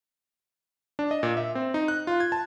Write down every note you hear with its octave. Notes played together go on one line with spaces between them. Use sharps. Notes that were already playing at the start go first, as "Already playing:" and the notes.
D4
D#5
A#2
E5
C4
D#4
F#6
F4
G#6
A5